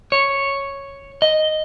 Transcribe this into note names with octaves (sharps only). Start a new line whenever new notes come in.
C#5
D#5